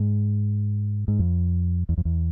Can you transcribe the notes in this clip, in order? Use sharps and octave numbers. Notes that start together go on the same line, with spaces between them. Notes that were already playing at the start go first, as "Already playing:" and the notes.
Already playing: G#2
G#2
F2
E2
F2
E2